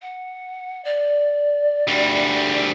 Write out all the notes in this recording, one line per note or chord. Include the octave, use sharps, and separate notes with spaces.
F#5
D5
D2 G3